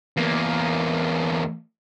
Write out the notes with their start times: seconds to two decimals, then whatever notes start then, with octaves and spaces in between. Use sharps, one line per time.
0.17 E2 A#3